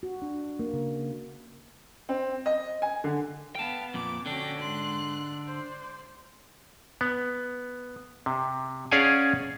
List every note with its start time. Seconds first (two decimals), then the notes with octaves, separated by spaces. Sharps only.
0.03 F#4
0.22 D4
0.59 A#3
0.73 C#3
2.09 C4
2.46 D#5
2.82 G#5
3.04 D3
3.55 B3 F5 G5 A5
3.94 F2 A#2 D6
4.26 D3 C#4 D4 F#4 G5
4.60 G#2 C6 F#6
5.48 C5 D5 C6
7.01 B3
8.26 C3
8.91 C#4 G#4 D5 F5 F#5 G#5